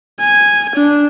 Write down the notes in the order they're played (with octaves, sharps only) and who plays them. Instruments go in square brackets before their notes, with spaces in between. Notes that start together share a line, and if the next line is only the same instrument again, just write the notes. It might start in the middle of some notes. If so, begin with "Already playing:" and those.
[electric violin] G#5
D4